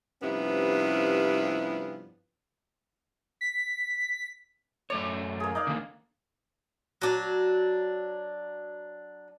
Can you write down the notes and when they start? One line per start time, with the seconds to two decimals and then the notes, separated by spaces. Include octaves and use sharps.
0.22 G2 C3 F3 B3 C#4 E4
3.41 B6
4.90 F#2 A3 C#5 D5
5.40 A#3 G#4
5.55 D#4 D5 F5
5.67 D3 D#3 A#3
7.02 F#3 D4